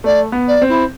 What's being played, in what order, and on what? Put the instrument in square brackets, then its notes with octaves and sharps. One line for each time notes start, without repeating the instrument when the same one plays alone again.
[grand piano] A3 [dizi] D5
[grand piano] B3
[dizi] D5
[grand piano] C4
[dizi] E4